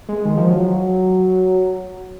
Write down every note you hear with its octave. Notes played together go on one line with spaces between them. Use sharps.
G#3
D#3
F3
F#3